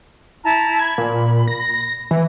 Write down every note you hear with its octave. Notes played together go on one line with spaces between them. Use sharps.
E4 A5 A#5
B5 G#6
A#2
A#6
E3